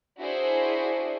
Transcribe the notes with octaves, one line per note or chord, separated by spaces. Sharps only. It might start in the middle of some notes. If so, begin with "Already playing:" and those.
D4 E4 F#4 G#4 C5